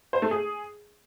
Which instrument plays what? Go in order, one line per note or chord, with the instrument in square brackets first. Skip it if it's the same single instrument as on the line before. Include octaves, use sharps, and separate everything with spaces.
[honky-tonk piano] C5
A3
G#4